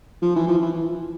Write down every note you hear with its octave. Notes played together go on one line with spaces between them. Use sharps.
F3
E3
F3
E3